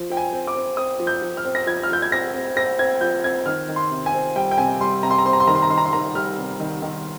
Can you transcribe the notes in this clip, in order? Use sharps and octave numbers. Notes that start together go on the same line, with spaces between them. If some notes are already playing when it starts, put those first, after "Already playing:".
Already playing: F3
F3 G5
G#5
C4
D6
C4
C4 D#6
F3
G6
F3
F6
C4
A#6
F3 G#6
F6
F3 G6
G#6
C4 A#6
C4
C4 A#6
C4 G#6
F3 G6
C4 G#6
D#3 F6
D#3
C6
C3
G#5
C4
G3 G5
G5
C3 G#5
G3 C6
C3 A#5
C6
A#5
C4 C6
A#5
C6
D#3 A#5
C6
A#5
D#3 C6
A#5
C6
D#3 A#5
G3 F6
C3
D#3
D#3